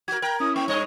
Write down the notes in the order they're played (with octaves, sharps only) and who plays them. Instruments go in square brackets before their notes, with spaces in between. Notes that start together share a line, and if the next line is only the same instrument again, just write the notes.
[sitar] F#4 A#4 [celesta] G#6
[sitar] A#4 [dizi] G5 [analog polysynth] B5 G6
[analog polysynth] C#4 E4 [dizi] D#6
[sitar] A#3 [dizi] G5 [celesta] C#6
[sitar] G2 D#5 [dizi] C#5